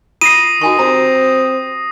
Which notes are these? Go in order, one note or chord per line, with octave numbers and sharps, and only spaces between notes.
F4 D#6 A#6 C7 D#7
D#3 F#4 G#5 C#6
C4 F#4 G4 A#5